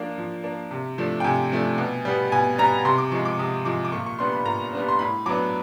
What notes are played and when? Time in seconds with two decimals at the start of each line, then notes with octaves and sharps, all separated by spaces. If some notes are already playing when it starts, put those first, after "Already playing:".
Already playing: F3 A#3 D4
0.18 F3
0.44 A#3 D4
0.71 C3
0.98 F3 A3 D4
1.20 G5
1.24 C3 G#5
1.52 F3 A3 D4
1.78 B2
2.05 G3 B3
2.32 B2 G#5
2.58 G3 B3 A#5
2.85 C3 C6
2.98 D6
3.12 F3 G#3 C#6
3.25 D6
3.39 C3 D#6
3.65 F3 G#3 D6
3.85 D6
3.92 A#2 C#6
4.06 C#6
4.19 G3 B3 D4 C6
4.32 B5
4.45 A#2 A#5
4.73 G3 B3 D4
4.88 C6
4.99 A2 B5
5.26 F#3 B3 D4 D6